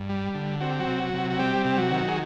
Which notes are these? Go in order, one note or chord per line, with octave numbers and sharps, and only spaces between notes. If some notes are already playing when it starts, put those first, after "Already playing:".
Already playing: G2
G3
D3
C4 F#4
G4
F#3 F#4
C3
C3
F#4
G3 C4 G4
C3 G4
F#3 F#4
D#3
G#4